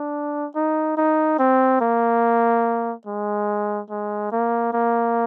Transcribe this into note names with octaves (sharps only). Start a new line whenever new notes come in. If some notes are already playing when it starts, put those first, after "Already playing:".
Already playing: D4
D#4
D#4
C4
A#3
G#3
G#3
A#3
A#3